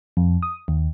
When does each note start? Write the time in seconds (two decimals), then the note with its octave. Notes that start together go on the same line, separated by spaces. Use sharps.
0.17 F2
0.43 D#6
0.68 D#2